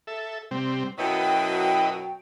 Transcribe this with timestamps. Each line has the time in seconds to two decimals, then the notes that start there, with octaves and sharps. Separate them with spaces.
0.07 A4 E5
0.51 C3 G3 C4
0.99 F#2 B2 F#3 E4 B4 D#5 G5